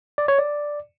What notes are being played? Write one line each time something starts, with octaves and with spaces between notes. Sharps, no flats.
D5
C#5
D5